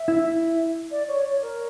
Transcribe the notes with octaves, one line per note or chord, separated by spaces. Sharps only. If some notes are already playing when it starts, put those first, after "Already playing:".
Already playing: E5
E4
D5
C#5
C#5
A#4